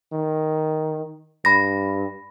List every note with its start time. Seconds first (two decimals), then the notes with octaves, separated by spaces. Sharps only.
0.13 D#3
1.45 G2 B5 A#6